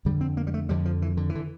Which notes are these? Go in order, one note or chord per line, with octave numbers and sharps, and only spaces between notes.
F2 D3 G3
C4
A#3
G3
A3
F2 D3 G3
F3
E3
D3
E3
D3